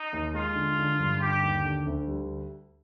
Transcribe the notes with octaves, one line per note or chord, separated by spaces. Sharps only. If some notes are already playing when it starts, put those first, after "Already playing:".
Already playing: D#4
D#2
G#3 F4
D3
D3
G2
D3 G4
D#2
D3
D2
G3